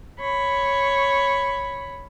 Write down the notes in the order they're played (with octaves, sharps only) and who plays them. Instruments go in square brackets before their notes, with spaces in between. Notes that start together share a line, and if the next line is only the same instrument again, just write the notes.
[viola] C#5 B5